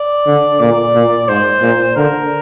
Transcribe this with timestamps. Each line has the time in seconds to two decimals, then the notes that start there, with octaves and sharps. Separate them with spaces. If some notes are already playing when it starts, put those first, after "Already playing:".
Already playing: D5
0.27 D3
0.60 A#2 D5
0.95 A#2
1.28 G#2 C5
1.62 A#2
1.96 D3 A#4